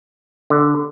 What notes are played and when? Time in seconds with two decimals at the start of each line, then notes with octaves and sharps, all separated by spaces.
0.50 D3